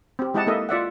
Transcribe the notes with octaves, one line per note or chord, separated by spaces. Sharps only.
C4 G4
G#3 E4 G4 D#5 F#5 A5
A#3 E4 A4 D#5 E5
F4 D5 E5 F#5